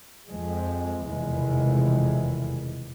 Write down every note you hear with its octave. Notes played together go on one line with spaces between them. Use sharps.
F2 G#3
F1 E2 B2 D#3 E3 G#3